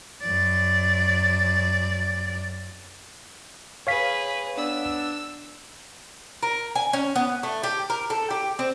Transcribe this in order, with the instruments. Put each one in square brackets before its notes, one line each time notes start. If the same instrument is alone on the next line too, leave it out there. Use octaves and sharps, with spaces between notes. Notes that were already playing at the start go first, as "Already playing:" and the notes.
[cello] F#2 D5
[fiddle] G#4 B4 [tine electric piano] C#5 F5 B6
[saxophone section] B3 D4 [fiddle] E6
[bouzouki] A#4
G#5
C#4
B3
A3
G4
A#4
A4
G4
C4